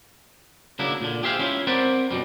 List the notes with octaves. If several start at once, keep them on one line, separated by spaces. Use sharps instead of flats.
C#3 F#3 A#3 D4 E4
A#2 D3
G4 G#4 C5 E5 F5
C#4 E4 F4
C4 A#4 C5 D5 F#5 B5
F#2 B2 G3